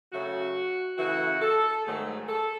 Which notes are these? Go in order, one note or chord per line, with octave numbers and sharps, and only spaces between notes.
C#3 F#3 A3 F#4
C#3 E3 A3 F#4
A4
G#2 D#3 F#3 A3 G#4
A4